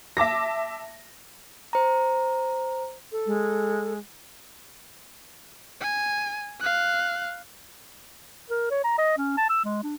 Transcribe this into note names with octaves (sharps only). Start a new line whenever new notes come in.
E5 A5 D6 A#6
C5 A#5
A4
G#3
G#5
F5 F#6
A#4
C#5
A#5
D#5
C#4
A5
E6
G#3
D4